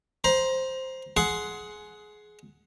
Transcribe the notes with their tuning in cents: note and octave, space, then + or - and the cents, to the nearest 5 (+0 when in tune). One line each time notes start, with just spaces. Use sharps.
C5 +0 A#5 +25
G#4 +20 F#5 +0 C6 +0